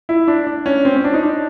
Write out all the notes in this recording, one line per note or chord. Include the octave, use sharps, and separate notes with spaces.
E4
D4
D4
C#4
C4
C#4
D4
D#4
D4